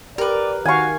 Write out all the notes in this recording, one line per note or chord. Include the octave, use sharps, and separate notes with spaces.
G4 A#4 B4 D5
D#3 F#4 F5 G#5 C#6